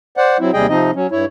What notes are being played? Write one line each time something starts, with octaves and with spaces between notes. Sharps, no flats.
C5 D5 F#5
F#3 C4 E4
D#2 C3 G3 G#4 D#5 G5
C3 F3 C4 D#4 D#5
F#3 C#4
G2 E4 C#5